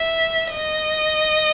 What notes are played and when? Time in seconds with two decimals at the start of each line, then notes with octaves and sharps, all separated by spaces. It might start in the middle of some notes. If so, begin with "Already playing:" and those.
Already playing: E5
0.52 D#5